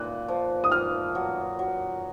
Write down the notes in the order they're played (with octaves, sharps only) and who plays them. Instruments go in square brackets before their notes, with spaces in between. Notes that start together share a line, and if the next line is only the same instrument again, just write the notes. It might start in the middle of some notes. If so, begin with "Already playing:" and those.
Already playing: [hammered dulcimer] A#2 [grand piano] F#6
[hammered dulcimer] F3
[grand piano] D#6
[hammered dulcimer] A#2 [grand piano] F6
[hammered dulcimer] F#3
F#3